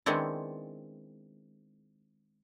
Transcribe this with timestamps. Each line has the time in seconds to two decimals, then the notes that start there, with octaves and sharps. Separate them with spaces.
0.06 D#3 G#3 B3 C4 D4 E4